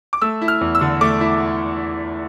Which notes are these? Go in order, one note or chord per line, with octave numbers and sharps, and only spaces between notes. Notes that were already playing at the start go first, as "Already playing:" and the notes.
D6
A3 E6
E4
F6
E2
E6
D3
A3 D6
E4